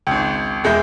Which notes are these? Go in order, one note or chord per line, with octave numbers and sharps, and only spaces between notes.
G#1 C#2
E1 E2 G#3 E4 G6